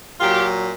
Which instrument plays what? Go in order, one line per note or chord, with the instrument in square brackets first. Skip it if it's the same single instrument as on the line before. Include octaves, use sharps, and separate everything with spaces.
[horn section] A#2 F#3 F4 G4